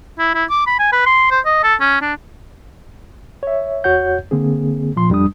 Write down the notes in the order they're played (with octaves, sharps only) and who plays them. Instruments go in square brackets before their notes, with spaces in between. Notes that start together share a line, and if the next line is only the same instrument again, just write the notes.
[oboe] E4
E4
D6
B5
G#5
B4
C6
C5
D#5
A4
C#4
D4
[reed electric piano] C#5 E5
E2 F#4 C#5 F#5 G6
D3 A#3 C4 G#4
A#2 F3 C6
F2 G3 D4 D#6